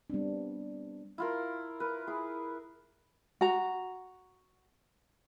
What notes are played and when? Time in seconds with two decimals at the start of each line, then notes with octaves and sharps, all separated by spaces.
0.10 G3 B3 C4 D4
1.18 E4 F4 A#4
1.80 A#4 B4
2.07 E4 G#4
3.41 F#4 A#5